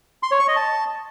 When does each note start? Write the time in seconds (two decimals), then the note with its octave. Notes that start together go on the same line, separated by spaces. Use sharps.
0.23 C6
0.31 C#5
0.40 C#6
0.48 D#5
0.56 A5